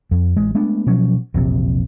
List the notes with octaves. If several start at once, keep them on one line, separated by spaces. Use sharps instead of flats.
F2
A1 G#3
G#3 A3 B3 D4
B2 F3 F#3 C#4
E1 A#1 C3